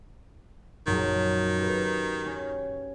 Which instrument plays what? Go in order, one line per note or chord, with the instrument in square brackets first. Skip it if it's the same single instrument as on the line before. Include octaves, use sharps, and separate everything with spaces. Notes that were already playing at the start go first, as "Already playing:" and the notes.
[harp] A#1 F#2 [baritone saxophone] D#3
[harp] G4 B4
C#4